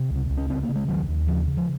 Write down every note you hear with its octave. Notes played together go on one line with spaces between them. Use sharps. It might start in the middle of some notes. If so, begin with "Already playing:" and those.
Already playing: C3
C#2
C#2
C#4
C#3 C4
A#3
C#3
G#3
D#2 D#3 F#3
D#2
C#3 F3
C#3
F3